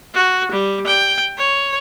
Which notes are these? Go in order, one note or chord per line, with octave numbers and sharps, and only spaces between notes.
F#4
G3
G5
C#5